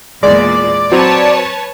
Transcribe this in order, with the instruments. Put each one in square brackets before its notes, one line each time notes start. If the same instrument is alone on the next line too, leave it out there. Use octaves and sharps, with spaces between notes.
[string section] E2 A#2 [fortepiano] G#3 [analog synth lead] D5
[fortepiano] F#3 C4 [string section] B4 C#5 A5